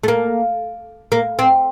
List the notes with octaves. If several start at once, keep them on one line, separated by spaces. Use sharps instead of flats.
A3
A#3
A#3
C4